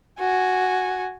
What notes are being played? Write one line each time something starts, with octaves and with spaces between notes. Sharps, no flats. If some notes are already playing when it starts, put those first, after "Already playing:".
F#4 G#5